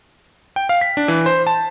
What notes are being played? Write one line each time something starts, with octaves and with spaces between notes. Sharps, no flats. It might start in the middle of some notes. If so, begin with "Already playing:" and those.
G5
F5
B6
D4
E3
C5
A5